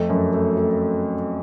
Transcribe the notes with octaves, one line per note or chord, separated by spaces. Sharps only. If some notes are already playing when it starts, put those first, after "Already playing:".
Already playing: F2 A3
F#2
A3
A3